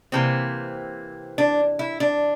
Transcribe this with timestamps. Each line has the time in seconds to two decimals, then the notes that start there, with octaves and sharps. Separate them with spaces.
0.12 C3 E3 A#3 C4
1.38 D4
1.79 E4
2.00 D4